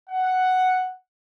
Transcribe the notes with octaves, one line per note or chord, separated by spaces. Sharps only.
F#5